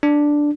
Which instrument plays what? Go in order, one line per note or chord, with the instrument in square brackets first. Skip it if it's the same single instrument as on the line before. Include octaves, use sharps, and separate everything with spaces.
[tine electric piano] D4